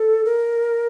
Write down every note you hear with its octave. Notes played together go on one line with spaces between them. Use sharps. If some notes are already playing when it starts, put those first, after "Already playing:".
Already playing: A4
A#4